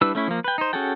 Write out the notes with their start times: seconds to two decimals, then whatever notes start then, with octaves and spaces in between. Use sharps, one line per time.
0.01 G3 D4 E4 B4 E6
0.15 A3 C#4 E4
0.28 F3 A#3
0.44 B4 G5
0.58 D#4 C5
0.73 C#4 F#4 G#4 A4 G5